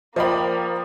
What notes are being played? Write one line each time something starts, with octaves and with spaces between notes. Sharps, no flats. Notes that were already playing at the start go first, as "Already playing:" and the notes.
F3 A#3 C5 D5 D#5 F5 G5 B5